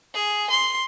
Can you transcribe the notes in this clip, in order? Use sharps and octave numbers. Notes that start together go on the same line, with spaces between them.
G#4
C6